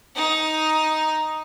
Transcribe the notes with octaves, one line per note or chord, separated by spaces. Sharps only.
D#4